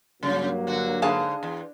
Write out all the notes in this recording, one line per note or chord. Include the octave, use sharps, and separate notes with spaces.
G2 C#3 F#3 A#3
D3 F#4
G#2 D3 G#4 F5 A5
E2